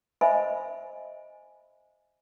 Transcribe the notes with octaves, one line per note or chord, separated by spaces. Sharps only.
C5 D#5 E5 G#5 B5